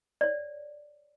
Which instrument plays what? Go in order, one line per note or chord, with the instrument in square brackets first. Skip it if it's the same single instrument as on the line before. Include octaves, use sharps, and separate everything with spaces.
[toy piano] C#5 D5